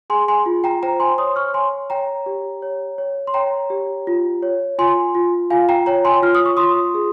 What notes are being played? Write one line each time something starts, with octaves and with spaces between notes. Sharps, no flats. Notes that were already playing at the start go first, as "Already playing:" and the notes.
G#4 G#5 C6
G#5 C6
F4
G5 A#5
C5 G5 A#5
G#5 C6
C#5 C6 D#6
C#6 F6
C#5 G#5 C6
C#5 G5 A#5
G4
C#5
C#5
C6
C#5 G5 A#5
G4
F4
C#5
F4 G#5 C6
F4
F4 F5 G#5
G5 A#5
C#5 G5 A#5
G#5 C6
F4 F6
D#6
C#6
F4 C6 D#6
G#4